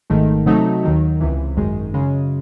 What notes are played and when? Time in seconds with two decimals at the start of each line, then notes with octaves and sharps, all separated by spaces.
0.10 G#1 G#2 D#3 A3
0.46 C3 F#3 A3 D#4
0.83 D#2 D#3 F#3
1.21 C#2 C3 E3
1.57 G#1 F#2 D#3 G#3
1.94 F#2 C#3 G#3